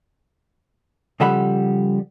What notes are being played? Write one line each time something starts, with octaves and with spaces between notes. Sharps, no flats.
C#3 F3 G3 A4 F#5 B5